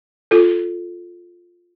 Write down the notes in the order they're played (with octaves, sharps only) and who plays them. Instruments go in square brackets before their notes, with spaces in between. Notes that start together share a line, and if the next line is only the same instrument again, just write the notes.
[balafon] F4 A4